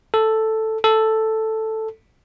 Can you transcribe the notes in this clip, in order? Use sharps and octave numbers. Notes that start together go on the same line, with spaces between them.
A4
A4